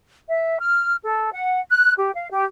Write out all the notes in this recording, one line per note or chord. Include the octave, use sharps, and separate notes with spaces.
E5
F6
A4
F#5
F#6
G4
F5
G4